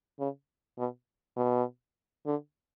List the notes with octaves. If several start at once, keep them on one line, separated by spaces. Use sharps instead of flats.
C#3
B2
B2
D3